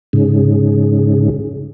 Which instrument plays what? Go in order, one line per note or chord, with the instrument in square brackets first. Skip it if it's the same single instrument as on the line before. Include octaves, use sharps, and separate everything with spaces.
[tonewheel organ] G#2 C#3